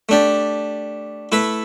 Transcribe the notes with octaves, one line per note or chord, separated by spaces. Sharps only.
A3 D4 G4 D5
A3 E4 B4 E5